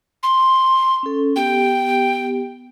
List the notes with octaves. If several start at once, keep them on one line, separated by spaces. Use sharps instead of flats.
C6
C#4 A4
B3 G4 G5